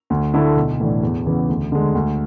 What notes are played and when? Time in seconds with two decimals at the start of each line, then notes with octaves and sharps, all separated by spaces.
0.10 D2
0.34 D3 A3 E4
0.56 B1
0.80 A2 E3 A3 D4
1.03 E2
1.26 C#3 E3 B3
1.49 D2
1.72 D3 G#3
1.95 D2